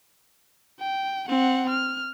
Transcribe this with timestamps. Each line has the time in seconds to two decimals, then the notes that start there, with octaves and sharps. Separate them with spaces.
0.80 G5
1.29 C4 F#5
1.69 F6